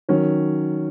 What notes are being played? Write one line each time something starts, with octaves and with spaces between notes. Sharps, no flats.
D#3 F#3 C#4